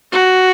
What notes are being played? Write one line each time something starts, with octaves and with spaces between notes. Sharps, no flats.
F#4